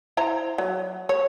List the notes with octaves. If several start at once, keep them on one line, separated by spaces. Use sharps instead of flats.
E4 C5 A#5
F#3
C#5